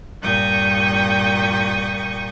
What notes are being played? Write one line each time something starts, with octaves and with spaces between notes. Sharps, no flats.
G2 A#2 G5 C#6 D#6